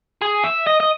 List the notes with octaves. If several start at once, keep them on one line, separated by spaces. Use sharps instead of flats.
G#4
E5
D#5
D#5